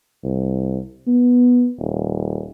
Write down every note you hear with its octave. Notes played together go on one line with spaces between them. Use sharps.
C2
B3
D#1